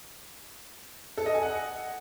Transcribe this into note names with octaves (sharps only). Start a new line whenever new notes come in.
A4
D#5
G#5
F#5